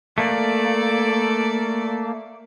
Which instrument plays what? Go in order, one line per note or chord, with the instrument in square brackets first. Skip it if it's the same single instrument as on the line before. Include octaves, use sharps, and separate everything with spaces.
[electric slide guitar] A3 A#3 [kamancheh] A4 D5